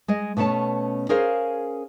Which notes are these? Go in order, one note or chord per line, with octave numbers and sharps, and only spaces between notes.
G#3 D#5
B2 A3 B3 C#4 A5
C#4 G#4 A#4 C5 F5